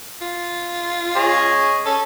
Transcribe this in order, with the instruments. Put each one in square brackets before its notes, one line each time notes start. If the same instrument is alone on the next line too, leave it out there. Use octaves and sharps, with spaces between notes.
[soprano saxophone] F4
[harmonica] G#4 C#5 D#5
[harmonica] C#4 [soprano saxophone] A4